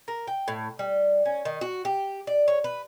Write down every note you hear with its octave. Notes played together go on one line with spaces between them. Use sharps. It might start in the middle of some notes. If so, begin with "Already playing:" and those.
A#4
G5
A2
G3
C#4
D#3
F#4
G4
D5
C#5
B4